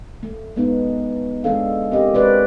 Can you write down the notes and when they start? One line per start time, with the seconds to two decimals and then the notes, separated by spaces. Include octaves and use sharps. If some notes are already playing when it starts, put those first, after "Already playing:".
0.23 A3
0.56 G#3 B3 D#4
1.44 G#3 A3 D4 G#4 A4 F5
1.91 C4 G4 A#4 D#5
2.14 G#3 F#4 B4 C5 D5